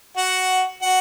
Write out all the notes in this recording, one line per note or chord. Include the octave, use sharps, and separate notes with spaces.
F#4 F#5
F#4 F#5